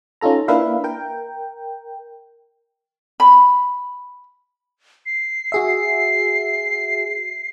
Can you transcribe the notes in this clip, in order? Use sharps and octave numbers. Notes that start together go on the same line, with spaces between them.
C#4 D#4 F4 A4 A#5
A#3 D4 E4 B4 E5 F5
A#4 G5
B5
C7
F#4 G#4 E5